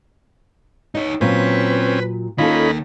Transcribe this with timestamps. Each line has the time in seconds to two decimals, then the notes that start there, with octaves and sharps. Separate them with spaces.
0.95 D#4 C#5 D#5
1.21 A#2 F#3 C4 C#4 B4
2.38 D#3 A#3 C#4 D#4 F4 A4 B5